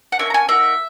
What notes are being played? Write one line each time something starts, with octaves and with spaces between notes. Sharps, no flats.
F#5
A#3 C#4 F#4 E5
A#5
G#5
A#3 D#4 F#4 E5